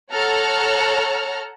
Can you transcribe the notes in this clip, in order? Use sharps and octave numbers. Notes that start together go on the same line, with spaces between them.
A4 C#5 F#5 A#5 F6